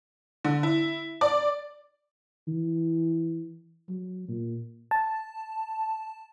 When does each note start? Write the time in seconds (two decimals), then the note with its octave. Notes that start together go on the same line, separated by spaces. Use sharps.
0.45 D3
0.63 E4
1.21 D5
2.48 E3
3.89 F#3
4.28 A#2
4.91 A5